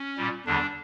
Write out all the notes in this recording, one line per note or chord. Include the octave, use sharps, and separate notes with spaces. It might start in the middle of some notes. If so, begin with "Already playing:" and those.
Already playing: C#4
A#2 G3
E2 D3 G3 D4